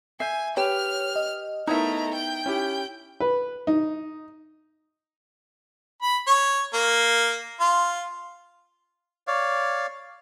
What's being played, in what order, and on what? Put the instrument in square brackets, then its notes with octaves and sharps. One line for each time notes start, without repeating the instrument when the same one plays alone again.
[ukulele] E5 [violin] G#5 [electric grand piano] G6 C7
[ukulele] G4 [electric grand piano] B4 [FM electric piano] C#5 [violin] F6
[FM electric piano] D#5
[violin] A3 A#5 [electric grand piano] B3 E4 A#4 [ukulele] D#4 C#5 E5
[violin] G5 G6
[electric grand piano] C#4 E4 G4
[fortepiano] B4
D#4
[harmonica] B5
C#5
A#3
F4
[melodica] C#5 D5 F5